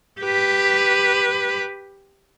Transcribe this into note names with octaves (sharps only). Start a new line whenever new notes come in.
G4 B4